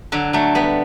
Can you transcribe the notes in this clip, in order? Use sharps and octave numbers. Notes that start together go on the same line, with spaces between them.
D3 F#3
F#3 A3
G3 B3